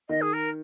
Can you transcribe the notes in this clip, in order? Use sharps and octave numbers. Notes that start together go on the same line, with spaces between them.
D#3 D#5
G#4
A#4